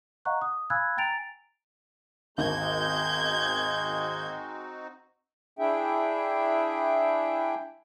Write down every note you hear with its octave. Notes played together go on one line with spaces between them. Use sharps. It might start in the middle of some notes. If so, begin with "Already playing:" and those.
D#5 F5 F#5 A#5 C#6 F#6
D#6
F5 G#5 B5 E6 F#6 G#6
G5 G#5 A#5 A6 D7 F7
G#1 D#2 G#3 C4 D#4 F#4 G6 G#6
D4 E4 G#4 E5 G5